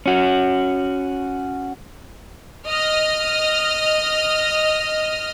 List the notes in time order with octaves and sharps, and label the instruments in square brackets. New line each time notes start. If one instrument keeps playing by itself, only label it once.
[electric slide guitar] C#4 F#4
[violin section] D#5 F6